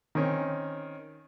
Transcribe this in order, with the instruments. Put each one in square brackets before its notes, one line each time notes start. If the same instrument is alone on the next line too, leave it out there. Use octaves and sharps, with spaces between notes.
[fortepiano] D#3 C4 C#4